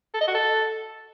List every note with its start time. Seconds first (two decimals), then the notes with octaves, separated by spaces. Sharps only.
0.14 A4
0.21 D#5
0.28 F#4
0.34 A4